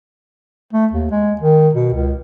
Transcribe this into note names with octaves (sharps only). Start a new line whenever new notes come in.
A3
D#2
G#3
D#3
B2
C#2